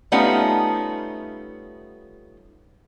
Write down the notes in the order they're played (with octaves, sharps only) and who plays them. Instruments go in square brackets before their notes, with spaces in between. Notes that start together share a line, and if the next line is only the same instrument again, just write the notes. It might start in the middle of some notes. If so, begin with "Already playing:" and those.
[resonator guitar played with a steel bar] G3 A3 B3 C#4 D#4 F4